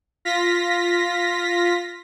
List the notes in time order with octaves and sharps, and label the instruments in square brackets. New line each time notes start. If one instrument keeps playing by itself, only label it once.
[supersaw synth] F4 A#6 B6